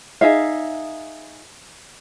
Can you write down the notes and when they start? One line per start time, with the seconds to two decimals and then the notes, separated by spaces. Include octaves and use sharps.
0.21 D#4 G#4 E5 F5